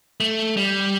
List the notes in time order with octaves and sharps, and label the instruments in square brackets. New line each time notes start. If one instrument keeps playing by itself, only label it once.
[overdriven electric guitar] A3
G3